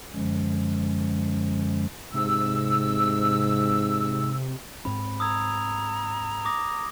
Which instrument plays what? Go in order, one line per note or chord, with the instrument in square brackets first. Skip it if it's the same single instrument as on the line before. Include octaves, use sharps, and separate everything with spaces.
[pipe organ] F#2 D3 F3 G#3 C#4
[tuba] G#2 [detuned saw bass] C3 [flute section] E6
[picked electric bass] G#2 C4 [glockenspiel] B5
[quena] A#5 [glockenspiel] D#6 E6 G#6
[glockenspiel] D6 D#6 A#6